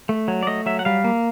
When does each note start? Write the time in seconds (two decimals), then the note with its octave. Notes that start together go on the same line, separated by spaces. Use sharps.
0.09 A3
0.28 F#3
0.43 D5
0.47 A3 D#5
0.66 F#3 E5
0.79 F#5
0.85 G3 F5
1.04 A#3